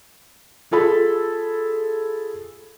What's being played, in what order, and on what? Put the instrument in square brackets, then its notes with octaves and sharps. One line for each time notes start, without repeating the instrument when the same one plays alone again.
[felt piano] F4 G#4 A4 B5